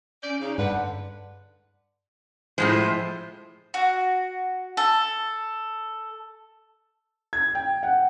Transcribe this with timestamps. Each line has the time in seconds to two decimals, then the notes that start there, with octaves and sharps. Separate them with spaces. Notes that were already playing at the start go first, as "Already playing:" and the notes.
0.23 C#4 D5 G6 D7
0.40 C#3 D#4
0.58 G2 D3 B4 F#5
2.58 A2 F3 G#3 C5
3.74 F#4
4.77 A4
7.33 G#6
7.55 G5
7.83 F#5